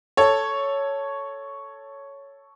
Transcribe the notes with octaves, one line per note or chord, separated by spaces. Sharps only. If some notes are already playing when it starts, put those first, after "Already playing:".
A4 C#5